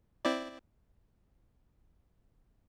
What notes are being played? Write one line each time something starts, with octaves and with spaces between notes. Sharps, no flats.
C4 E4 D5